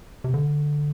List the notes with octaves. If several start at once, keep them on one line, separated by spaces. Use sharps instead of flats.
C3
D3